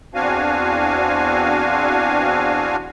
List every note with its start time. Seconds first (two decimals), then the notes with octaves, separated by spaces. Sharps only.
0.14 E2 C4 D4 F#4 F5 G#5